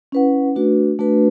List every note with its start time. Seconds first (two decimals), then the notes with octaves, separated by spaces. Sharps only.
0.12 C#4 E4 B4 F#5
0.55 A3 D4 F#4 B4
0.99 A3 D4 F#4 B4